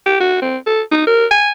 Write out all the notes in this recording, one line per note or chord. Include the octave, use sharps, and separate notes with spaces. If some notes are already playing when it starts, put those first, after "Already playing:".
G4
F#4
C4
A4
D#4
A#4
G#5